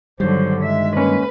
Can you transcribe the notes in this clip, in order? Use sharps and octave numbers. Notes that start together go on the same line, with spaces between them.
G2 D3 D#3 F#3 G3 C5
G#3 E5
A#3 C#4 B4